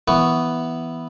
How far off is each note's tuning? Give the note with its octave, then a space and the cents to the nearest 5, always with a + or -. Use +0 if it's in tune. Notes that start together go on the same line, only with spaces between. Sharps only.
E3 +0 B3 +0 C#6 +10